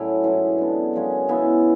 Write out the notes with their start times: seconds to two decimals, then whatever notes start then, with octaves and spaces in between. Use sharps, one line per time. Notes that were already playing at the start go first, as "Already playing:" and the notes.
Already playing: A2 F#3 C#4 E4
0.23 G#2 E3 G#3 C#4
0.58 D3 G#3 B3
0.94 F#2 C#3 G#3 C#4
1.28 C#3 E3 B3 E4